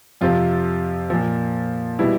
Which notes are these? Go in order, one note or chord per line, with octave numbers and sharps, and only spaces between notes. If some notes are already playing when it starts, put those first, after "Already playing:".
F2 C3 F3 F4
A#2 F3
B2 G3 E4